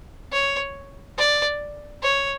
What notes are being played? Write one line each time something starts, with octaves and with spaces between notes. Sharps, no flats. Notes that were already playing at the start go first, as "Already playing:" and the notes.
C#5
D5
C#5